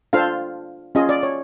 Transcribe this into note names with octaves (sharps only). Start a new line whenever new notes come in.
D4 F4 A4 C5 F5
C#4 F4 G#4 D#5
D5
C#5